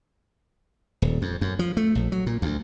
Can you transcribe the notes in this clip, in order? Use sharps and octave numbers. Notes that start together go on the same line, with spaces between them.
D#1
F2
F#2
F3
A3
A#1
F#3
A#2
D2